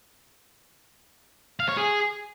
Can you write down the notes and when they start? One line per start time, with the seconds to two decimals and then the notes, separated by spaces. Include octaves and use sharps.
1.60 F5
1.69 C#5
1.77 G#4